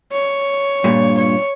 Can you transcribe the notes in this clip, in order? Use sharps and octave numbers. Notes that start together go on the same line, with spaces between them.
C#5
G2 A#2
C#5